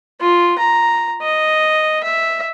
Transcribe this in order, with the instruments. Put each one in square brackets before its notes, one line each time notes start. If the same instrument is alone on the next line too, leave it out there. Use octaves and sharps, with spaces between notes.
[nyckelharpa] F4
A#5
D#5
E5